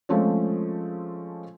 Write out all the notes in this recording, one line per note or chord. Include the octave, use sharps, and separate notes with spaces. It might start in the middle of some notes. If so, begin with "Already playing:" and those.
F3 G#3 A3 C4 C#4